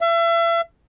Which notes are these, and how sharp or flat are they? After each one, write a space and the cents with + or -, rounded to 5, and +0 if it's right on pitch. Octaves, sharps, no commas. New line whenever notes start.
E5 +35